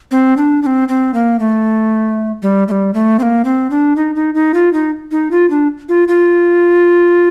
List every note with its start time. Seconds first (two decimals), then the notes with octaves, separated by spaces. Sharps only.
0.11 C4
0.37 D4
0.62 D4
0.66 C4
0.88 C4
1.14 A#3
1.39 A3
2.42 G3
2.68 A3
2.71 G3
2.94 A3
3.19 C4
3.23 A#3
3.45 C4
3.71 D4
3.96 D#4
4.15 D#4
4.35 D#4
4.54 F4
4.73 D#4
5.11 D#4
5.31 F4
5.50 D4
5.89 F4
6.08 F4